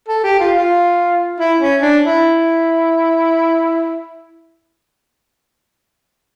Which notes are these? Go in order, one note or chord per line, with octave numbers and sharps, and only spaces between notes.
A4
G4
F4
F4
E4
C#4
D4
E4